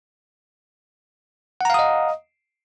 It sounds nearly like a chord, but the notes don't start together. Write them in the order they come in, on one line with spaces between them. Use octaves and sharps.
F#5 A#5 F5 D#6 D#5